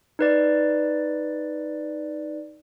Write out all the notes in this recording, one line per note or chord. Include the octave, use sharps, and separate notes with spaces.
D#4 B4 D5